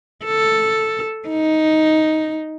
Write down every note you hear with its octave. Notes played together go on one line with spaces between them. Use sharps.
A4
D#4